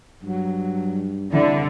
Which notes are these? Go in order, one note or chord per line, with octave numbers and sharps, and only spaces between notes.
G2 F#3
C2 D3 E4